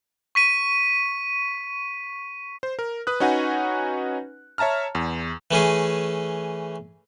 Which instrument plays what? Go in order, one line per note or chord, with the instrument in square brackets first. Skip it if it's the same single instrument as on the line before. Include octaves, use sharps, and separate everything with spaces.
[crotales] C#6 B6 D#7
[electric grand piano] C5
A#4
B4 D#6 F#6
C#4 D#4 F#4 B4 F#5 G#5
C#5 E5 A5 A#5 F6
E2
[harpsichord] E3 A3 C#4 G#4